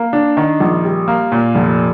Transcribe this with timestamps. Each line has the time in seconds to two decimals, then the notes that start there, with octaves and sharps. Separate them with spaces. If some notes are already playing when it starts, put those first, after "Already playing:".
Already playing: A#3
0.13 D4
0.37 D#3
0.60 A#1
0.85 G3
1.08 A#3
1.32 A#2
1.55 F1